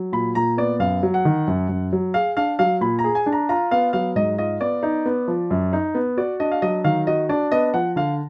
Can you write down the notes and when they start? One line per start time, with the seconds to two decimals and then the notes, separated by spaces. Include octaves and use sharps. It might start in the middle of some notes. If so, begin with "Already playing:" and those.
Already playing: F#3
0.13 A#2 B5
0.35 A#2 A#5
0.57 B3 D5
0.79 F#2 F5
1.03 F#3
1.14 F#5
1.25 D#3
1.47 F#2
1.69 F#2
1.93 F#3
2.14 G#4 F5
2.37 D4 F5
2.59 F#3 F5
2.81 A#2 B5
2.99 A#5
3.04 G#4
3.15 G#5
3.26 D4
3.32 A#5
3.49 F4 A#5
3.71 B3 F5
3.93 F#3 F5
4.16 G#2 D#5
4.38 F4 D#5
4.61 B3 D5
4.83 D#4
5.06 B3
5.28 F3
5.51 F#2
5.73 D#4
5.95 B3
6.17 F#4 D5
6.40 D4 D#5
6.52 F5
6.62 F#3 D#5
6.84 D#3 F5
7.07 F#4 D#5
7.29 D4 D5
7.52 B3 D#5
7.74 F3 F#5
7.96 D3 F5